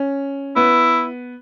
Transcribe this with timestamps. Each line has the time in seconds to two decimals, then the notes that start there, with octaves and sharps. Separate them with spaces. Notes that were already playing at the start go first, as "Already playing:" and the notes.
Already playing: C#4
0.56 B3 E4